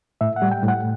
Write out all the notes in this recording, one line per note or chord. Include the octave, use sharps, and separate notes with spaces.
A2 E5
F#5
G3
G5
A2
F#5